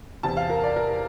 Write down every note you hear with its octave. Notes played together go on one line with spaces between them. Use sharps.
E2 C3 E3 A5
F5
A#4
D5
A#4